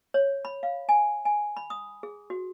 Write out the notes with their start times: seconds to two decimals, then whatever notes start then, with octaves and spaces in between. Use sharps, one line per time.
0.14 C#5
0.45 B5
0.63 F5
0.89 G#5
1.25 G#5
1.57 B5
1.70 D#6
2.03 G#4
2.30 F#4